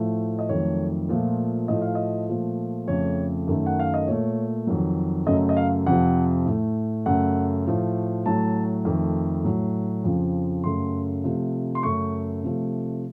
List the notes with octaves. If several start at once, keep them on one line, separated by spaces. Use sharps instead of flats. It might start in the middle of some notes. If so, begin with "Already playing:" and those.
Already playing: A2 F3 A3
D#5
F2 D#3 F#3 A3 C#5
A#2 F3 A3
A2 F3 A3 D#5
F5
D#5
A#2 F3 A3
F2 C#3 A3 C#5
F#2 D#3 A3
F#5
F5
D#5
A#2 A3 C#5
F2 D#3 F#3
F#2 C#3 F#3 A3 D#5
D#5
F5
F2 C3 F3 F#5
A2 A3
F#2 C#3 A3 F#5
A2 F3 A3
A2 F#3 A3 A5
F2 D#3 A3
A2 F#3 A3
F2 C#3 F3
F#2 C#3 A3 C6
C3 F3 A3
C6
F#2 C#3 A3 C#6
C3 F3 A3